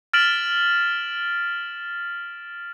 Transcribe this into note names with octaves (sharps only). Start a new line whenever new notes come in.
F6 A6 B6 D7 E7 F#7